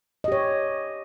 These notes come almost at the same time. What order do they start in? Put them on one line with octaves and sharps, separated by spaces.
D#5 G4 C#5